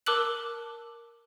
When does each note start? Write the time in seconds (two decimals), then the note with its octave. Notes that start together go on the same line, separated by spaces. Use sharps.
0.06 A#4 A5 D6 E6 F#6 F#7